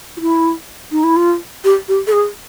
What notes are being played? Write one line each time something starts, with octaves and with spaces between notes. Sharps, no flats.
F4
E4
D#4
E4
F4
G4
G4
A4
G#4